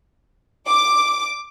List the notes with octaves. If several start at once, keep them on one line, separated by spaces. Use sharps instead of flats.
D6